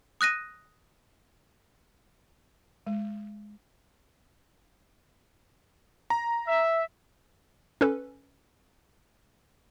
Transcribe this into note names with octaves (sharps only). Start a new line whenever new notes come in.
D#6 F#6 A#6 D#7
G#3
A#5
E5
C#4 A4 B4